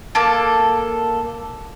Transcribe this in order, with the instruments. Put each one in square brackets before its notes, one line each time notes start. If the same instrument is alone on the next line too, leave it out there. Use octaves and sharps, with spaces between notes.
[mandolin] A#3 A4